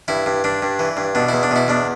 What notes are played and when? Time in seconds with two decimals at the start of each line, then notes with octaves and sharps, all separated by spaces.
0.08 G2 E4
0.26 G2
0.44 G2 D4
0.62 G2
0.79 E3
0.97 G2
1.15 B2 D4
1.29 E2 E4
1.43 D4
1.51 B2 E4
1.68 E2 D4